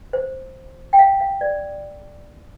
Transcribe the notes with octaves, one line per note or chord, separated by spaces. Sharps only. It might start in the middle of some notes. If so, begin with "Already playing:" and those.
C5
G5
F5
F5
D5